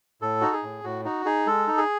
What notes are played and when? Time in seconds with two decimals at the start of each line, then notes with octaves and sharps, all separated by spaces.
0.22 A2 A4
0.41 D#4 F#4
0.52 G#4
0.63 A2
0.84 A2 F#4
1.05 D#4 F#4
1.25 D#4 G#4
1.47 G#3 A4
1.67 D#4
1.77 G#4